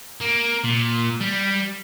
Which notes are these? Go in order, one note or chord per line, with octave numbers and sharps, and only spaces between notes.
A#3
A#2
G3